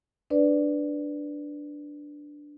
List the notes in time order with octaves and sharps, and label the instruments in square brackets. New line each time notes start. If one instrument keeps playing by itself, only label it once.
[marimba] D4 B4 D5